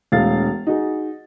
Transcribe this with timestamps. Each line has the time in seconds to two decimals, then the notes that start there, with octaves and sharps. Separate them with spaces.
0.12 E1 A3 F5 A6
0.67 D#4 F#4 G#4